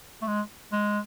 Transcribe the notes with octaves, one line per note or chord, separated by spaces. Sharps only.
A3
G#3
G#3